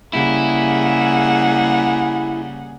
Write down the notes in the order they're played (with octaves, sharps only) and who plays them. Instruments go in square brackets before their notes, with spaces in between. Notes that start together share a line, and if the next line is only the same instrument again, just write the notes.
[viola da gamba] C#3 G3 A#3 [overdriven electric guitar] E4 [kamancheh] G#4 F#5